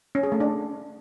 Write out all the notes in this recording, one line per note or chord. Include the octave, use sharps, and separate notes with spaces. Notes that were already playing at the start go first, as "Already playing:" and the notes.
C#4
G#4
A3
D4